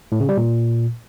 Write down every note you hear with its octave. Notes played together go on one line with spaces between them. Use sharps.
A2
C#3
G3
A#2